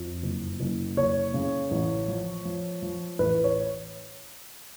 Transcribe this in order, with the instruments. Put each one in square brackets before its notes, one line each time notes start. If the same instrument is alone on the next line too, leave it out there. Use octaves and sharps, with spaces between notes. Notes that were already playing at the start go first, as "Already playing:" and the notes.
Already playing: [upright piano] F2
F#1
F#1
F#1 C#5
C#3
A1
F3
F3
F3
A1 B4
C#5